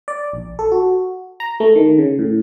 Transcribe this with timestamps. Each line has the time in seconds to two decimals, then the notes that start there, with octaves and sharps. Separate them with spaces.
0.08 D5
0.33 A#1
0.59 A4
0.72 F#4
1.40 A#5
1.60 A3
1.76 D#3
1.98 C#3
2.19 A2